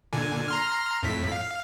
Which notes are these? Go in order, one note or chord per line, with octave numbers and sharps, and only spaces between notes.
A#2 D3 G#5
A#5 C6 F6
F2 A2 B6
F5